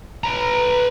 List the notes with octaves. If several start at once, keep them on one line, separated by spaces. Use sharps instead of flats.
B4 A#5